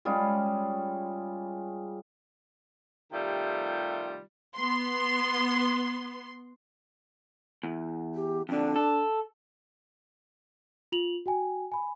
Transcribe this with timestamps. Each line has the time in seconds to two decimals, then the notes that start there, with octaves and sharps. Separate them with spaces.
0.05 G3 G#3 C#4 F4
3.13 C3 D#3 G3 A3 F4
4.57 B3 C6
7.63 E2
8.15 G4
8.49 F2 D3 D4
8.76 A4
10.92 F4 F7 F#7
11.26 F#4 G5 G#5
11.72 G#5 B5